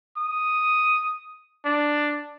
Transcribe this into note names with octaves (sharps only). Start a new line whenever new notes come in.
D#6
D4